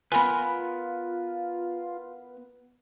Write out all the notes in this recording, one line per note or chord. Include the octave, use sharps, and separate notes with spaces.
B3 F4 A#4 B4 G#5 B5